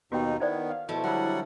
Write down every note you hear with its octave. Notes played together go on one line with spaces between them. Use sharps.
D#2 B2 B3 D#4 F#4 G4 G5
D#3 B3 D#4 E4 C5 D5
F5
B2 F3 A3 E4
D3 F#3 G3 F#5 B5